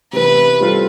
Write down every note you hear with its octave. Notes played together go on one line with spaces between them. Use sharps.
C3 E3 B3 B4
G3 C4 F4 A4